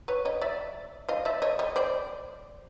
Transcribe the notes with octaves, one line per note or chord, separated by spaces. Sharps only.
B4 C#5
C#5 D#5
D5 E5
D#5 F5
D5 E5
C#5 D#5
C#5 D#5
C5 D5